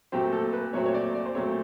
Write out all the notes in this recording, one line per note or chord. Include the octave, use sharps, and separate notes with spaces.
A#2 F#3 A3 C4 G4
A4
B4
A#2 F#3 A3 C4 C#5
C#5
D5
D5
C5
A#2 F#3 A3 C4 C#5